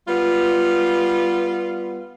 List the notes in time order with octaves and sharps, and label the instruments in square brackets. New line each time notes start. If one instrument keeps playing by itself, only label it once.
[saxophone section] G3 B3 F4